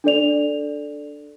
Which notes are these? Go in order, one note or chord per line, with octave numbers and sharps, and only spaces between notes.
D4 A4 D5 F7